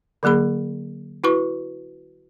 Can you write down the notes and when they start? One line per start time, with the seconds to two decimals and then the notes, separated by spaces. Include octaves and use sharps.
0.23 D3 F#3 A#3 G#4 B5
1.24 E4 F#4 B4 C#6